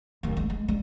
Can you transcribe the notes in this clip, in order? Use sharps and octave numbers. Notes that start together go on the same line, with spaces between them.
D1 D#2
G#3
G#3
G3 G#3